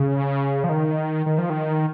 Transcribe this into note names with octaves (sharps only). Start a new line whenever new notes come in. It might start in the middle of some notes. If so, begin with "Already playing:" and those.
Already playing: C#3
F3
D#3
D#3
F3
D#3